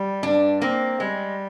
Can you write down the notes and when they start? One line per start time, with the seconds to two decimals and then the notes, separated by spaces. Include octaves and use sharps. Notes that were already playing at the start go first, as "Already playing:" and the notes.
Already playing: G3
0.23 G2 D4
0.61 A#3 C4
1.00 G3 G#3